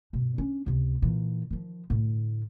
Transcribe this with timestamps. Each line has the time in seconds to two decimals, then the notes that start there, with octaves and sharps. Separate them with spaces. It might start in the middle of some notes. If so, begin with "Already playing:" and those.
0.13 G2 B2
0.38 C#4 D4
0.66 C#2 C3
1.02 A#2 E3
1.50 D#3 F3
1.90 A2 D3